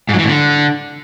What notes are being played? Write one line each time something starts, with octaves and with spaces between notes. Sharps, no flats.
G#2
F#3
E3
A2
D3